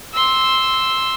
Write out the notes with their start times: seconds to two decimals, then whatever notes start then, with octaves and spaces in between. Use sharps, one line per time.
0.13 C6 E6